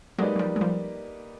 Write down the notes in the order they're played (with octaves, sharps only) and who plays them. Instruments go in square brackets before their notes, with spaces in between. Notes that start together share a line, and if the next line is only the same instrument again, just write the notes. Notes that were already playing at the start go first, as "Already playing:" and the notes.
[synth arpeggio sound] F#3 G#3 [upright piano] A#3 D#4 G4 B4 D5
[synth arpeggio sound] F#3
F3 G3
G#3
F3 G3